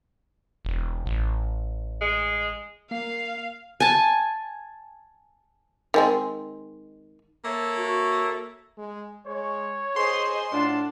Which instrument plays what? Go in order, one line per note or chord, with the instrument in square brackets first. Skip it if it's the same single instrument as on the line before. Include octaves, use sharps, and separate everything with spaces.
[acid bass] E1
A1
[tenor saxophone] G#3
[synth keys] A#3 C7 [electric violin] F5
[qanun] G#5 A5
[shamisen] D#3 G#3 C4
[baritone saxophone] A#3 [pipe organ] A4 C#5 E5
[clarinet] F#4
[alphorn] G#3
[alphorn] G#3 [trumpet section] C#5
[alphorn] G#4 [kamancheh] C5 D#5 [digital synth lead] C6
[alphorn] A2 [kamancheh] D4 [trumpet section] F4 F#5 A5